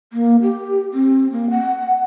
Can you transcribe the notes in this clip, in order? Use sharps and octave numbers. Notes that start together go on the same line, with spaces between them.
A#3
G4
C4
A#3
F#5